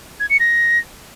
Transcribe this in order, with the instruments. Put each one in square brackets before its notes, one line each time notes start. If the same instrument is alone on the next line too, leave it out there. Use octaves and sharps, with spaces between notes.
[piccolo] G#6
C#7
A#6